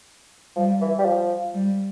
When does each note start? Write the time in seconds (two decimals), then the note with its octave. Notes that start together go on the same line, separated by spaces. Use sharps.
0.56 F3 G3
0.81 E3
0.99 G3
1.05 F3
1.54 G3